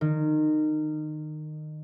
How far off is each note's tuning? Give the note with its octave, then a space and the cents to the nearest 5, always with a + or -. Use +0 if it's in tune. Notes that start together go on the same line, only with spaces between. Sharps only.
D#3 -25